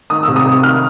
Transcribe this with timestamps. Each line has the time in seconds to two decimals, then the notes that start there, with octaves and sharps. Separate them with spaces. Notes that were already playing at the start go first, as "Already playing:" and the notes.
0.10 D#3 D#6
0.23 C3 E6
0.36 D#6
0.45 C3
0.63 D#3 F6